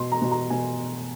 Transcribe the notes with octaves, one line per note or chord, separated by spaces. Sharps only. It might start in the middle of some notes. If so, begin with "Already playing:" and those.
Already playing: B2 C6
A#5
B2
A#5
B2 G#5